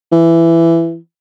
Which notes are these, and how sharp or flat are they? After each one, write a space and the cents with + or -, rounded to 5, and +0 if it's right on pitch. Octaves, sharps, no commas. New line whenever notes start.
E3 +15